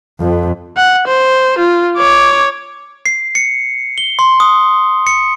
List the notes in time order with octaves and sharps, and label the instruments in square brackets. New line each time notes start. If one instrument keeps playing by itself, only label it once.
[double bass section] F2
[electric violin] F#5
C5
F4
C#5 D6
[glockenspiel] C7
C#7
G7
C6
D#6
C#7